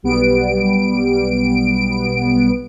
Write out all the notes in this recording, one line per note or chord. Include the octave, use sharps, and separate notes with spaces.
B1 G3 B3 D7